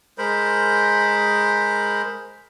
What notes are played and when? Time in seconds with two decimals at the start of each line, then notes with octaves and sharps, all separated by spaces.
0.18 G#3 A#4 C5 B5